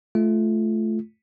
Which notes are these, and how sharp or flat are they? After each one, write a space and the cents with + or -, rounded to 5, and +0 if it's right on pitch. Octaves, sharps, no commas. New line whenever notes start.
A3 -20 F4 -15